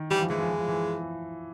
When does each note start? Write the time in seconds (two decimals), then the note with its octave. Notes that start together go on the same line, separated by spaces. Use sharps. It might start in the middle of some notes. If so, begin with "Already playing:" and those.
Already playing: D#3
0.10 E3 G3
0.20 F3
0.30 E3 G#3
0.39 F3
0.49 E3
0.59 F3
0.68 E3